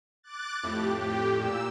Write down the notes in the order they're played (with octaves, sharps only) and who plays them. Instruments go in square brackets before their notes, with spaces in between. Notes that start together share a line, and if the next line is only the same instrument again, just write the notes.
[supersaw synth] D6 F#6 A6
[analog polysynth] F2 A2 [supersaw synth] G4
[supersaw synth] G4
A#2 E6